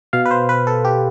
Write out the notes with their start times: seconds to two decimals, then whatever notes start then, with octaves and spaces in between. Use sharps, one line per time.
0.13 B2 F5
0.26 B4
0.31 C5
0.49 B4
0.67 A4
0.85 G4